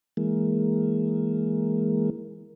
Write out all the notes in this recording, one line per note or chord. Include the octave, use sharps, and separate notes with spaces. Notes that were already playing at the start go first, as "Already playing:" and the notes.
E3 G#3 A#3